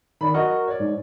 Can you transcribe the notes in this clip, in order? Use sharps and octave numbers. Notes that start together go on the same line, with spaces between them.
D#3 D5 B5
F#3 F#4 A#4 D#5 F#5
C#5 D5
G#2